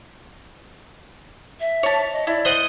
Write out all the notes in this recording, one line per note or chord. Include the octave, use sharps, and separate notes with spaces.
E5
C#5 A5
D#5
E4 D5
C5 D#5 F#5